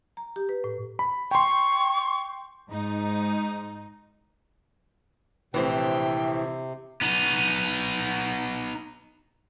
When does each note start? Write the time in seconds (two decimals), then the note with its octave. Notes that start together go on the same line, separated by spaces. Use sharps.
0.17 A#5
0.36 G4
0.49 B4
0.64 A2
0.99 B5
1.31 G5 C6 C#6
2.69 G#2 D#4
5.54 A#1 A2 C3 E3 C4 C5 G5
7.01 B3 D#4